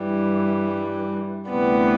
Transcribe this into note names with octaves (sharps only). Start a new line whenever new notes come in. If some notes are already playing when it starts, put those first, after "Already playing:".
Already playing: G2 E3 G3
D2 C3 E3 G3 B3